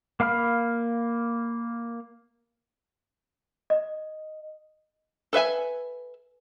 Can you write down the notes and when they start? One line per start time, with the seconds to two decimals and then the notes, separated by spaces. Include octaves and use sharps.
0.20 A#3 F5 B5 F6
3.70 D#5
5.33 A4 B4 E5 G#5